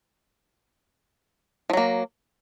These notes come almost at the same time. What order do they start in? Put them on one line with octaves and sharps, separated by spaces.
F3 F#3 A#3